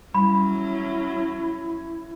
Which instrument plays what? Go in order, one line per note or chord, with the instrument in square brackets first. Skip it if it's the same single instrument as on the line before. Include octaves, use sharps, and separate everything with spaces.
[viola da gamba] F#3 C#4 [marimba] G3 [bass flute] E4 [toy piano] B5